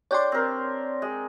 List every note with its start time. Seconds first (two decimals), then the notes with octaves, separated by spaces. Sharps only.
0.11 D4 G4 C#5 D5 C6
0.32 C4 A#4
1.02 G#3